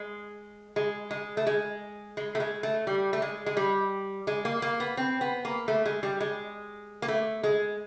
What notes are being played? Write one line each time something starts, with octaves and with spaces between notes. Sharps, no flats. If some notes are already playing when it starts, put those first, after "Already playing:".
Already playing: G#3
G#3
G#3
A3
G#3
G#3
A3
G#3
A3
G3
A3
G#3
G#3
G3
G#3
A#3
A#3
B3
C4
B3
A#3
A3
G#3
G3
G#3
A#3
A3
G#3